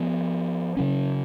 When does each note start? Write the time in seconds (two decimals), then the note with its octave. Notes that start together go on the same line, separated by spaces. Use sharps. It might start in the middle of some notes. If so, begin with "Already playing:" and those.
Already playing: F3 B3
0.77 C#3 F#3 C#4